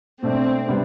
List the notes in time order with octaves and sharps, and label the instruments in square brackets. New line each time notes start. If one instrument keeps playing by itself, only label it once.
[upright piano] B2 A3 D4 [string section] C4
[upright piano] C3 G3 B3 D4